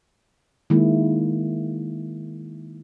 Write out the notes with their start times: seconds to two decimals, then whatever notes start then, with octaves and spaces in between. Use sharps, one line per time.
0.70 D#3 G#3 A#3 E4